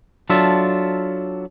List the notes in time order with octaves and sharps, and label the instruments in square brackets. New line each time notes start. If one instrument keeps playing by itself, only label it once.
[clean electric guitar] F#3 D4 F4 A4 E5